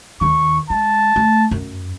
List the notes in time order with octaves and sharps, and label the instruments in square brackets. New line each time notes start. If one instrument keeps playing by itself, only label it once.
[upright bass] D#2 D#3 [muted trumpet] C#6
[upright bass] G#3 [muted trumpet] A5
[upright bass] A3
F#2